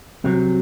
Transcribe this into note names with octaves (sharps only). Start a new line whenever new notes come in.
C2 C3 F#3